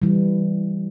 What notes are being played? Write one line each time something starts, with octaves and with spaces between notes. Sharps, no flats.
E3 G3